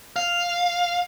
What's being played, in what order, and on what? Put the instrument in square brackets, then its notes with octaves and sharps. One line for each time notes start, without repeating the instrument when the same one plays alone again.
[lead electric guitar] F5